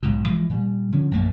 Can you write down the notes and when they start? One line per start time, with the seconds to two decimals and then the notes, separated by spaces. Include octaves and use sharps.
0.03 B1 G#2 B2
0.26 E3 F3 G#3
0.49 A#2 G3
0.92 D3 F3 C#4
1.11 A#1 F#2 A3 A#3